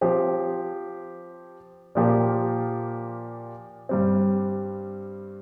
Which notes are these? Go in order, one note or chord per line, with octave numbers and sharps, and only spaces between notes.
F3 C4 G4 C5
A#2 F3 A#3 G4 A#4
G2 G3 C4